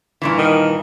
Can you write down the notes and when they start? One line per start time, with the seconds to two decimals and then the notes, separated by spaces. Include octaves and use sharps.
0.22 G2 A#2 E3
0.38 D#3